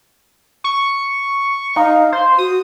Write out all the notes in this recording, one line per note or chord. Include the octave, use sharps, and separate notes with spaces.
C#6
D#4 F5
C5
F#4 D#6